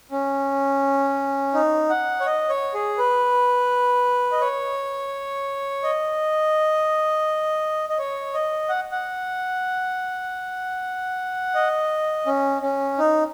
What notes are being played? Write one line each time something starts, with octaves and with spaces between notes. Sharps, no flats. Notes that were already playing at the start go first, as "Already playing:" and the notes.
C#4
D#4
F#5
C#5
D#5
C#5
G#4
B4
D#5
C#5
D#5
D#5
C#5
D#5
F#5
F#5
D#5
C#4
C#4
D#4